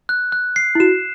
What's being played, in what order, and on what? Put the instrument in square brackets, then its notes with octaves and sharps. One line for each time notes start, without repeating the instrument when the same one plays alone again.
[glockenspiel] F#6
F#6
C7
[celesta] E4
[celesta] F#4 [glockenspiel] E7